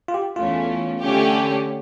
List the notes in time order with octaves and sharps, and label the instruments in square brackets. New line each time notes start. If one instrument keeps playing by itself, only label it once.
[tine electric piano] F4
G4
[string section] E2 E3 A3 C#4 [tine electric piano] F4
[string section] D3 A3 C#4 G4